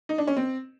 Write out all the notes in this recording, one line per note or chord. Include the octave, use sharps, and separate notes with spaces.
D#4
D4
C#4
C4